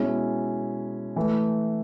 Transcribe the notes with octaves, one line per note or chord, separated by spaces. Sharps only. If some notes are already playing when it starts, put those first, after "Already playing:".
Already playing: B2 G#3 C#4 E4
E3 A3